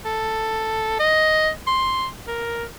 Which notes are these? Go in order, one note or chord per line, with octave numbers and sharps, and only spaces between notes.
A4
D#5
C6
A#4